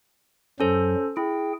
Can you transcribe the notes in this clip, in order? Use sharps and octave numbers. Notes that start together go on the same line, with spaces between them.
F#2 F#3 C#4 A4 C5
E4 G#4 G5